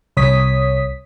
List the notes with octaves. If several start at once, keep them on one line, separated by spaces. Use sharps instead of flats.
C2 C#5 D#6 B6